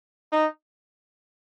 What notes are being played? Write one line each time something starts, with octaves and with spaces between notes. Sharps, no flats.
D#4